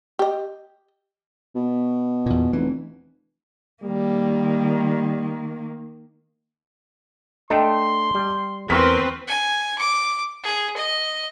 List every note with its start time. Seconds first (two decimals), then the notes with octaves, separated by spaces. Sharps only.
0.19 G4 D#5
1.55 B2
2.26 E2 A#2
2.53 F1 E3
3.83 D#3 G3 A#3
7.50 A3 D4 A4 D#5 G5 A5 C6
8.15 G3
8.70 E2 C4 A#4 B4 C#6 F6 B6
9.27 G#5
9.78 D6
10.43 G#4
10.76 D#5